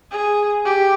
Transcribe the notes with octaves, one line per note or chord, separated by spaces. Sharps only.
G#4
G4